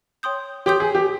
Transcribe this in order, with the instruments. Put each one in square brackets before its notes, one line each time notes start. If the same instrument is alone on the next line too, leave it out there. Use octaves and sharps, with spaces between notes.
[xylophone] C#5 G5 C6 D#6 G6
[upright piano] G4 [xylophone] C#5 G5 C6 D#6 G6
[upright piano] G#4
G4